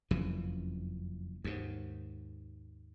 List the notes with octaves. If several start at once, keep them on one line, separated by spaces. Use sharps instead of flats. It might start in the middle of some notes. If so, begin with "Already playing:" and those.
F#1 F2 C#3 E3
D#2 G#2